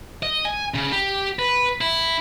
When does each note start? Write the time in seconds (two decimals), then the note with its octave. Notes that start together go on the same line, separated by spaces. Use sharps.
0.23 D#5
0.45 G#5
0.74 C#3
0.92 G4
1.39 B4
1.81 E4